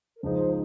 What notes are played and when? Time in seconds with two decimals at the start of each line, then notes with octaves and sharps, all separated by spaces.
0.16 A#4
0.23 C#2 C#3 F3 G#3 D#4 C5